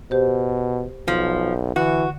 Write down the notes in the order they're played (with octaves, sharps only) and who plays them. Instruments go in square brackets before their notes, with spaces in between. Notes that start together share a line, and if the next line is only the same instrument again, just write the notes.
[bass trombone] B2 [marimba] G4 C5
[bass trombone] B1 [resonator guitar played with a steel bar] F3
[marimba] D3 [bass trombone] E3 [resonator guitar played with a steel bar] F#4